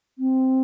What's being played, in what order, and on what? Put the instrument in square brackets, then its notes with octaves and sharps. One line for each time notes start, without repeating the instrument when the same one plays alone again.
[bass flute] C4